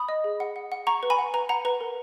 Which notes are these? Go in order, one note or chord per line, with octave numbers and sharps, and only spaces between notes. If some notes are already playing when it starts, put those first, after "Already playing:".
Already playing: B5 D#6
D#5
G#4
F#5
F#5
F#5
F#5 A#5 C#6
B4
G#5 B5
F#5
B4 A#5
F#5 A#5
B4 A#5
A#4